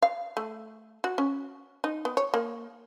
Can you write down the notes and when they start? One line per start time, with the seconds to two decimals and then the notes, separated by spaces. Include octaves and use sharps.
0.02 F5
0.37 A3
1.04 F#4
1.18 C#4
1.84 D#4
2.05 B3
2.17 C#5
2.34 A#3